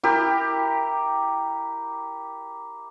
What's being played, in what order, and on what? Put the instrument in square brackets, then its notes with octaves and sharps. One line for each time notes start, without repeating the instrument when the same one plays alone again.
[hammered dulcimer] E4 G4 A#4